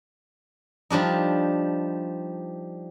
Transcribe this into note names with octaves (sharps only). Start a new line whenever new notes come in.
F3 G3 D4 D#4